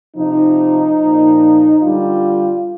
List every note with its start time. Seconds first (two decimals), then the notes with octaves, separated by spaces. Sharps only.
0.17 C3 F3 D#4
1.00 A#2 F3
1.83 D3 G3 F4